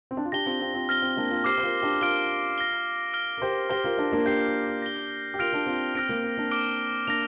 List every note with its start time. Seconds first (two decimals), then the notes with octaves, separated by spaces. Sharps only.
0.11 C4
0.17 D4
0.25 F4
0.32 D4 G4 A#6 G7
0.46 C4 F4
0.60 C4 F4
0.74 C4 F4
0.89 C4 F6 A#6 G7
1.02 C4
1.17 A#3 D4
1.31 C4 F4
1.44 G4 C5 D6 F6 C7
1.58 C5
1.63 F4 A#4
1.82 D4 G4
2.01 F4 A#4 F6 D7 G7
2.58 A#6 G7
3.13 F6 D7 G7
3.38 A#4
3.42 G4 C5
3.69 G4 C5 A#6 G7
3.84 F4 A#4
3.98 D4 G4
4.12 A#3 D4
4.26 D4 G4 G6 C7 G7
4.82 A#6 G7
5.34 G4
5.39 F4 A#4 F6 A#6 D7 F7
5.53 D4 G4
5.66 C4 F4
5.95 C4 F6 A#6 D7
6.09 A#3
6.24 C4
6.37 A#3 D4
6.51 D6 F6 D7 G7
7.07 A#3 D4 A#6 F7